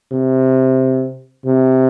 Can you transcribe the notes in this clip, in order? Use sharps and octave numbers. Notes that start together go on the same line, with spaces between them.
C3
C3